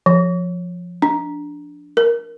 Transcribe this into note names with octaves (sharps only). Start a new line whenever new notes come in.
F3
D4
A#4